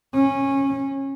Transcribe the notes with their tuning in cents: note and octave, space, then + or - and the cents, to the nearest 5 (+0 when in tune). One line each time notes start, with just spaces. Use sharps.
C#4 -20